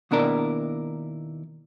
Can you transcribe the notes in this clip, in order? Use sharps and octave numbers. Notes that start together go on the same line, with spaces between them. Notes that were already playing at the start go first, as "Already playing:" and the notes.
D#2 B2 D4 E4 A#4 D5